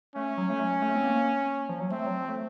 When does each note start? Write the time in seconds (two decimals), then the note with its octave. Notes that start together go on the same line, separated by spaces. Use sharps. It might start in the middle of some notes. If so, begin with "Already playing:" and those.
0.15 A3 C#4
0.38 F#3
0.50 A3
0.60 F#3
0.82 A3
0.95 C4
1.04 A#3
1.69 F3
1.80 F#3
1.91 A3 C4
2.06 F#3
2.21 F3
2.29 A3